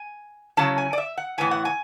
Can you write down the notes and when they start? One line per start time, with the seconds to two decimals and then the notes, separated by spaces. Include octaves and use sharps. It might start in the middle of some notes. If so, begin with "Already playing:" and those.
Already playing: G#5
0.57 C#3 F#3 C#4 E4 A5
0.78 G#5
0.93 D5
0.98 E5
1.17 F#5
1.38 A2 E3 B3 E4 G#5
1.51 F#5
1.65 G#5